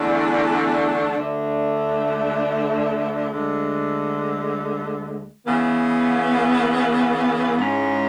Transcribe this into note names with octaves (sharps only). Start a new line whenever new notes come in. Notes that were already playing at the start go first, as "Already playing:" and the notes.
Already playing: E2 D3 A3 D4
D2 D3 A3 D4
D2 D3 G#3
C#3 E3 B3
G#2 G#3 C#4 E4